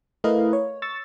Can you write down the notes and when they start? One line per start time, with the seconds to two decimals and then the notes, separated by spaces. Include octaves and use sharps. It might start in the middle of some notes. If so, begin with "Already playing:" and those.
0.24 A3 E4 A#4 B4 D#5 F5
0.53 C#5
0.82 C#6 E6 A6